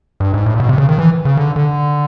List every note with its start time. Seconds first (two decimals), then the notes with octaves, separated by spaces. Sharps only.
0.20 G2
0.34 G#2
0.46 A2
0.54 A#2
0.60 B2
0.69 C3
0.78 C#3
0.89 D#3
0.99 E3
1.25 C#3
1.37 D3
1.56 D3